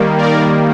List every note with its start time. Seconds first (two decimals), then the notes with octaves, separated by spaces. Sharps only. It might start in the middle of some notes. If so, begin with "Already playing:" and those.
Already playing: D#3 G3 A#3
0.18 A#4 D5